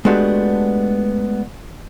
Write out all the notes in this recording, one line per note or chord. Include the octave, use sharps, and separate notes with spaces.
G#3 A3 B3 D4 F#4 G4